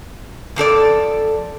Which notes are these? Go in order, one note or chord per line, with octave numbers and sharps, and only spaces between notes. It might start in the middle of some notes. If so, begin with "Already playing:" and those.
F2 F3 A4 D5